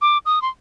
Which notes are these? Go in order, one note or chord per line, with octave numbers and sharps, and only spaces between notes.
D6
D#6
C6